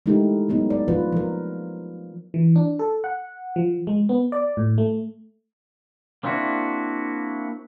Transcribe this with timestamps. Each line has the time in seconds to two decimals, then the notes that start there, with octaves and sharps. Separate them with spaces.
0.06 G#3 A3 D#4 E4 G4 A#4
0.49 F#3 A3 B3 D#4
0.70 D5
0.88 F3 F4 B4
1.12 F3 A#4
2.34 E3
2.56 D4
2.79 A4
3.04 F#5
3.56 F3
3.87 G#3
4.09 B3
4.32 D5
4.57 A2
4.78 A3
6.23 A#3 C4 D4 E4 F#4